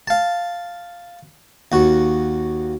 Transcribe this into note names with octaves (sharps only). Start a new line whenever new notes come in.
F5 A5
D#2 F#4